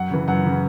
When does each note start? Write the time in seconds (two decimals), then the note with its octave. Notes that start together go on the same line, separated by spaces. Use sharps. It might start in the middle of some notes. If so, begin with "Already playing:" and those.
Already playing: F#2 F#5
0.10 C#3 E3
0.28 F#2 F#5
0.44 C#3 E3